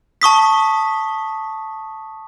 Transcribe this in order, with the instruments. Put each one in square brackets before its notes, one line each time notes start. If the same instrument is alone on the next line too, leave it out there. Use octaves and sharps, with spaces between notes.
[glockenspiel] A5 C#6 D#6 B6